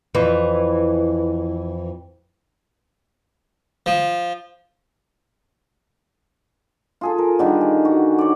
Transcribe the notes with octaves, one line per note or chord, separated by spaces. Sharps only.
F2 E3
F3
F4 G#4 A4
A#4
D3 D#3 G3
G#5
F#4
C#5 D5